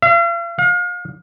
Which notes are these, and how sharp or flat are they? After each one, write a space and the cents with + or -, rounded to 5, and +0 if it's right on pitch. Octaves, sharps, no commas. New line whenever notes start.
F5 -45
F5 +35